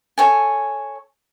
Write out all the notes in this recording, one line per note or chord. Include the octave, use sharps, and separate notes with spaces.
A4 C#5 G#5